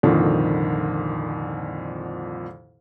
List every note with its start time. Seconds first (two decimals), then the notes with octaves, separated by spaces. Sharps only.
0.03 C2 F2 A#2 D3 D#3